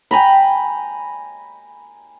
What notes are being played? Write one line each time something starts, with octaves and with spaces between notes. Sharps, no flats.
G5 G#5 A#5 B5